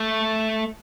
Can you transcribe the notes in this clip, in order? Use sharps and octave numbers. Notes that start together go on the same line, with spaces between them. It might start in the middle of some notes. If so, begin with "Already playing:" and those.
Already playing: A3